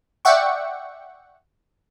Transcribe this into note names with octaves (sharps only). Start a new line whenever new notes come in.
D5 E5 F#5 G5 C#6